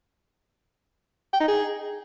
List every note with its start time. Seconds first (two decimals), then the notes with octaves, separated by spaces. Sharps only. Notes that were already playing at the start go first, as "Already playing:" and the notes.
1.33 G5
1.41 D#4
1.48 G#4